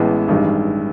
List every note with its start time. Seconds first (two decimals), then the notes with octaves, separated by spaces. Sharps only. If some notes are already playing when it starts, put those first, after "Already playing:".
Already playing: A1 A2 E3 G#3 B3
0.28 A1 G2 D#3 G#3